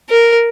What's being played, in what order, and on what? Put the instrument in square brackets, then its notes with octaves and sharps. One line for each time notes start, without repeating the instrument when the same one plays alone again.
[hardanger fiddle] A#4